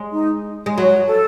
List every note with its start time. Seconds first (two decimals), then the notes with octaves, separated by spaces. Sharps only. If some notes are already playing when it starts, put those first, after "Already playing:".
Already playing: G#3
0.12 D#4
0.66 G#3
0.77 F#3 F#4
1.06 A4